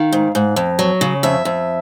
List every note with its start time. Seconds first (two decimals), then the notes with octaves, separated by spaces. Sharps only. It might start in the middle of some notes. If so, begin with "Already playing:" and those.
Already playing: D#3 F5
0.13 G#2
0.35 G#2
0.56 F2
0.79 F#3
1.01 C#3
1.23 F2 E5
1.45 F2